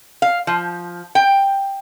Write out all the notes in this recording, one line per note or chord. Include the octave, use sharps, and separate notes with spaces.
F5
F3
G5